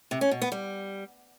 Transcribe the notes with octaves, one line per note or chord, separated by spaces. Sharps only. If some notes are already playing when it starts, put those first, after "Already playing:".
C3
C#4
B2
B3
G3